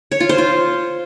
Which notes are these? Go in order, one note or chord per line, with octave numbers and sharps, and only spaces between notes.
C#5
F4
C5
F4